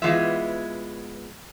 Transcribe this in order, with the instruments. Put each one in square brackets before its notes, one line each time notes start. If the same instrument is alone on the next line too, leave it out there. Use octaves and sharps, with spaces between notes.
[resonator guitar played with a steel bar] E3 G#3 B3 F4 E5